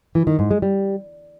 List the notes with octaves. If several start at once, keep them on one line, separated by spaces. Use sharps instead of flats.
E3
D#3
G#2
G#3
G3